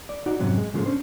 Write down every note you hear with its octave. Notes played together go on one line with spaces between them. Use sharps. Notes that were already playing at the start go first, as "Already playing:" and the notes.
D5
D#4 F#4 D5
F2 G#2 C3 F#3 C#4
G#3
G#2 C#3 F3 F#3 G#3 A3
C#4 D4 C5